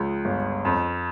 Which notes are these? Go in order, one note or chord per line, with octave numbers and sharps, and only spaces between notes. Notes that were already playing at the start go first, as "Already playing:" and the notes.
Already playing: C#2 F3
G1
F2